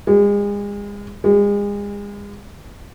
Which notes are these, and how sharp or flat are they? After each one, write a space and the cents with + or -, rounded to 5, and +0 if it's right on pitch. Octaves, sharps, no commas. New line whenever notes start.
G#3 -35
G#3 -35